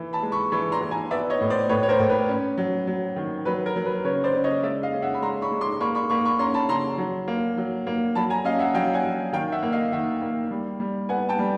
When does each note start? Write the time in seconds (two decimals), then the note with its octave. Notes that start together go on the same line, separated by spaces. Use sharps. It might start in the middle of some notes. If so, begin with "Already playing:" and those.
Already playing: E3
0.13 A5 B5
0.22 G#3
0.32 B5 C#6
0.52 E3 B5 C#6
0.72 A#5 C6
0.81 E3
0.91 G#5 A#5
1.11 B3 D5 E5
1.30 C#5 D#5
1.41 A2
1.50 C5 D5
1.69 A2 B4 C#5
1.83 C#5
1.89 A#4 C5
1.99 A2
2.09 B4
2.29 C#4
2.58 F#3
2.87 F#3
3.16 D#3
3.45 F#3 B4
3.66 A#4
3.76 F#3
3.86 B4
4.04 C#3 B4 C#5
4.24 C5 D5
4.34 C#3
4.44 C#5 D#5
4.63 G#3 D5 E5
4.83 D#5 F5
4.93 C#4
5.02 E5 F#5
5.14 B5
5.22 G#3 A#5 C6
5.42 B5 C#6
5.52 G#3
5.61 C6 D6
5.80 A#3 B5 C#6
5.95 B5 C#6
6.10 A#3 B5 C#6
6.25 B5 C#6
6.39 C#4 A#5 C6
6.54 A5 B5
6.69 C#3 A#5 C6
6.98 F#3
7.28 A#3
7.57 F#3
7.87 A#3
8.15 F#3 A5 B5
8.30 G#5 A#5
8.45 C#4 D#5 F5
8.59 E5 F#5
8.74 F#3 F5 G5
8.93 F#5 G#5
9.04 F#3
9.33 D#3 F5 G5
9.52 E5 F#5
9.63 A#3
9.73 D#5 F5
9.92 D#3 E5 F#5
10.22 A#3
10.51 G3
10.80 G3
11.09 B3 F#5 G#5
11.29 G5 A5
11.39 G3